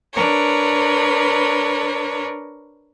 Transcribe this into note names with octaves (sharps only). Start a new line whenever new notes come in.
D4 A#4 B4 C#5